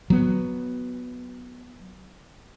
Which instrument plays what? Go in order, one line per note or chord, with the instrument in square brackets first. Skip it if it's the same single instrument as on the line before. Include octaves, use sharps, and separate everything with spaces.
[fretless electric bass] F#3 B3